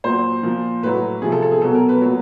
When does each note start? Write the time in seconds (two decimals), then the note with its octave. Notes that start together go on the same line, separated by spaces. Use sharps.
0.04 A#2 F#3 C5
0.43 A#2 F3
0.83 A2 F#3 B4
1.22 C3 F3 G#4
1.32 A4
1.42 A4
1.51 G#4
1.62 B2 F#3 A4
1.74 A#4
1.89 B4
2.01 A#2 F#3